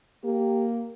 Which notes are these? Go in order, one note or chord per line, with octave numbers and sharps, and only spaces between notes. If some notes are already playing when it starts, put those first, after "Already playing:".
A#3 G4